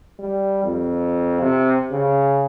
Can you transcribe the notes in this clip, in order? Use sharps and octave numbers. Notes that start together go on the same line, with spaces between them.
G3
F2
C3
C#3